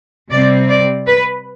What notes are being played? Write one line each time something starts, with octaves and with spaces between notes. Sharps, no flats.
C3 G3 C4 D5
D5
B4